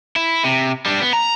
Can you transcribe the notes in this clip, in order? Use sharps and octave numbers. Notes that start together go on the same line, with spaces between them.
E4
C3
G3 D4
B3
A#5